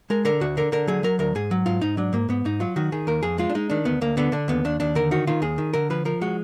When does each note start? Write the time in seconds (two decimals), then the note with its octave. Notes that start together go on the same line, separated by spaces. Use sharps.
0.10 G#3 A#4
0.25 D3 A#4
0.41 D2 F#4
0.57 D3 A#4
0.72 D3 A#4
0.87 F#3 G#4
1.03 F#3 A#4
1.19 D2 A#4
1.35 G#2 G#4
1.51 F#3
1.66 G#2 F4
1.81 G#2 D#4
1.97 F#3 D4
2.13 G#2 A#3
2.29 G#2 B3
2.45 G#2 D#4
2.60 F#3 F4
2.76 D#3 F#4
2.92 D#3 G#4
3.07 D#2 A#4
3.23 F2 G#4
3.38 G#3 F4
3.49 D4
3.55 G#3 D#4
3.70 D#3 D4
3.85 D2 B3
4.01 D2 A#3
4.17 D3 B3
4.32 D3 D4
4.48 D#2 B3
4.65 D#2 D4
4.80 D#2 D4
4.95 D3 A#4
5.11 D#3 F#4
5.27 D#3 F4
5.42 D#2 G#4
5.58 D#3
5.73 D3 A#4
5.90 F3 B4
6.05 F3 A#4
6.21 G#3 F#4